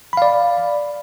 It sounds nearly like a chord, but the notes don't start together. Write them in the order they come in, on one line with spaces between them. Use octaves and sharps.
B5 F5 D5